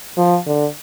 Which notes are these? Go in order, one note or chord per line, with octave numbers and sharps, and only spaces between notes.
F3
D3